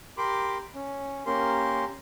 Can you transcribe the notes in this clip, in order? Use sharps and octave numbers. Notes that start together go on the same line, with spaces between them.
G4 A#4 B5 C6 D6
C#4
A#3 C#4 G4 A#4 C6